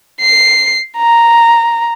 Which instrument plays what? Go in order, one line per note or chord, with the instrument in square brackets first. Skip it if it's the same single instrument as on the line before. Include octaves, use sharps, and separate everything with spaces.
[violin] C7
A#5